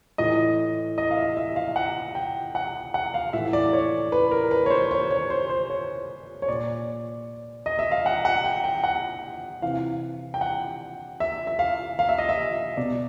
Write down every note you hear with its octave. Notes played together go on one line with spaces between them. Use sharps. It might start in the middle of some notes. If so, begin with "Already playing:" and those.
A2 E3 D#5
D#5
F5
E5
E5
F5
F#5
G5
F#5
F#5
F5
A2 E3 E5
D5
C#5
B4
A#4
B4
C#5
C5
C#5
C#5
C5
C5
C#5
C#5
A#2 D5
D#5
E5
F5
F#5
F#5
G5
G5
F#5
C3 E3 F5
G5
F#5
E5
E5
F5
F5
E5
D#5
E5
B2 D5